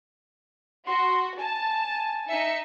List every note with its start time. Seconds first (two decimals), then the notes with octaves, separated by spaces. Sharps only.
0.87 F#4 C6
1.38 G#5 A5
2.28 D#4 E5 C#7